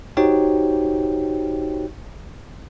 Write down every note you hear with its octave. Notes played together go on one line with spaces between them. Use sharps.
D#4 F#4 G4 C5 C#5 G5